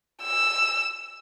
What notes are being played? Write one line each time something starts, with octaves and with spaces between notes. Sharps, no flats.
E6